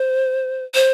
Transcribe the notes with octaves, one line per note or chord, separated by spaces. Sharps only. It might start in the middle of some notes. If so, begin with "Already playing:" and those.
Already playing: C5
C5